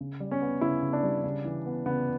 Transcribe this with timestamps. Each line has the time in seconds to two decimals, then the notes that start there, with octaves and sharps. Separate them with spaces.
0.01 C#3
0.20 G3
0.31 C#4
0.41 B3
0.61 C#3 E4
0.82 C#3
0.93 D4
1.03 G3
1.24 C#3
1.45 E3
1.66 B3
1.86 C#3 B3